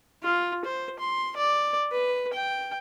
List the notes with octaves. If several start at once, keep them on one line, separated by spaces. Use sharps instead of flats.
F4
C5
C6
D5
B4
G5